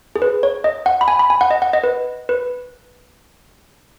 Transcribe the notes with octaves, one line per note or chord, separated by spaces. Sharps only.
G#4
B4
C#5
D#5
F#5
B5
G#5
B5
G#5
F#5
D#5
F#5
D#5
B4
B4